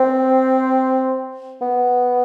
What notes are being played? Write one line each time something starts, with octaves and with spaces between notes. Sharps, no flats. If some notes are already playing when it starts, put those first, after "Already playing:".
Already playing: C4
B3